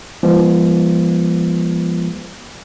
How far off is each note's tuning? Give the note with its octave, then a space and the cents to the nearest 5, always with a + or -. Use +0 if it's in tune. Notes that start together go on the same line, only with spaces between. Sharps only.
F3 -30 G#3 -40 B3 -45